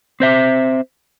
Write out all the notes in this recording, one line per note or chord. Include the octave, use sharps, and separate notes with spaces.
C4 C5 E5